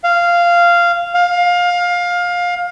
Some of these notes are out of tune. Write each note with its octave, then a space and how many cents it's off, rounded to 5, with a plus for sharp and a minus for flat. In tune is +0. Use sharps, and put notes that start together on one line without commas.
F5 -10
F5 +20